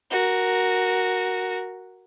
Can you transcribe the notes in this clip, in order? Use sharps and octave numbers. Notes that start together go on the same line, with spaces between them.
F#4 A#4